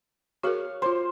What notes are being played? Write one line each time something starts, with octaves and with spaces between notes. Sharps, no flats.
F#4 G#4 A#4 C#5 F5
F4 C5 C6